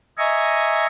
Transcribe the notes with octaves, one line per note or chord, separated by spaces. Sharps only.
D#5 E5 G#5 A#5 C#6